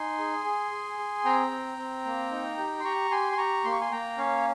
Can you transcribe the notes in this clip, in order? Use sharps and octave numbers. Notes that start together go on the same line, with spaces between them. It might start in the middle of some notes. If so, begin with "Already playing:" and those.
Already playing: D#4 G#5 C6
G#4
G#4
G#4
G#4
C4 G5 A#5
C4
C4
A#3
D#4
G4
C6
G4 A#5 C#6
G4 G#5 C6
C6
G4 A#5 C#6
A#3 C6
C#6
G#5 C6
A#3 G5 A#5
C#4 C#5 F5